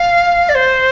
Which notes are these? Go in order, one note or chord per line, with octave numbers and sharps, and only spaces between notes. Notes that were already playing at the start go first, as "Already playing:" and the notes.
Already playing: F5
D5
C5